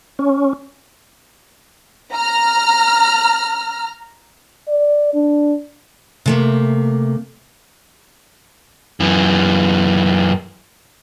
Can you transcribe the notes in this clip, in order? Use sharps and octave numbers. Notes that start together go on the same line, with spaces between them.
C#4
A#5 F6
D5
D4
C3 A3 A#3
F#2 E3